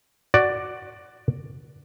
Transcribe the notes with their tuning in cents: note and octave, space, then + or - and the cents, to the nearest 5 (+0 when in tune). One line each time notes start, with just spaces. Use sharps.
F#4 +10 D5 +5